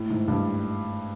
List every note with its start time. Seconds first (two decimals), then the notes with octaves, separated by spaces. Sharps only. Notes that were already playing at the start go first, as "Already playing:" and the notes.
Already playing: A2
0.10 G#2
0.28 G2